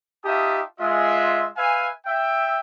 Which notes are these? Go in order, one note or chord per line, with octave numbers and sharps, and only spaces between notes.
D#4 F4 G4 E5 A5 D#6
G#3 F4 E5
B4 E5 F5 G#5
E5 G5